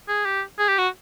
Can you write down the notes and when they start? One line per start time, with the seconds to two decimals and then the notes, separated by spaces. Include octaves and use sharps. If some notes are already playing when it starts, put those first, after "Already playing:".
0.09 G#4
0.25 G4
0.59 G#4
0.69 G4
0.78 F#4